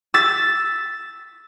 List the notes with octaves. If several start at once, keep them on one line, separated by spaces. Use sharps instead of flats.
E6 A6 B6